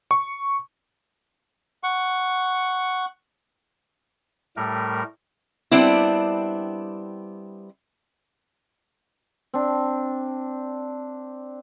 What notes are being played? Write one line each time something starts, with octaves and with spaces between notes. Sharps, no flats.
C#6
F#5 C#6
A2 G3 A3 A#4
G3 B3 C4 D4 E4
C4 D4